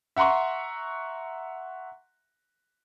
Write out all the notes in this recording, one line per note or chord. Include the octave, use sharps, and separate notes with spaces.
E5 F#5 A#5 C6 C#6